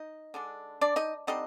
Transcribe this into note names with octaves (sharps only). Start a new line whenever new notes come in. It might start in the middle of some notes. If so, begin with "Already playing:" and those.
Already playing: D#4 D#5
D3 G#3 D4
D4 D5
D#4 D#5
D3 G3 C4 D#4 D#5